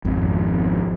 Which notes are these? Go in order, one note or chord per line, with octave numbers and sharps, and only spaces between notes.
G#1 F2